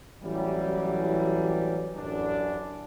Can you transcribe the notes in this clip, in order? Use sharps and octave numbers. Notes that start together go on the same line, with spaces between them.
A1 E3 F#3 G3
A1 F#2 D4